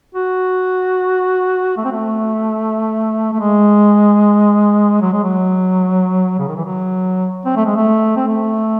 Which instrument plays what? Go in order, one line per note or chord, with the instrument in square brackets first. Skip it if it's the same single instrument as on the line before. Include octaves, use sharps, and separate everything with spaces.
[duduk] F#4
A3
C4
A3
A3
G#3
F#3
G#3
F#3
C#3
D#3
E3
F#3
C4
A3
G#3
A3
C4
A3